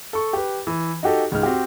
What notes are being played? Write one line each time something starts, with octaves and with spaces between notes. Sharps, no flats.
A4 C#6
G4 B4
E3
D#4 F#4 G4 A4
C#2 G#2 D#4 F6
C4 F#4 G4